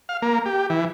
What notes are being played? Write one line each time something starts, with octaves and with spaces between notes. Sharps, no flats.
F5
A#3
G4
E3